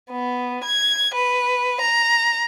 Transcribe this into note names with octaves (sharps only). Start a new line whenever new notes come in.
B3
G#6
B4
A#5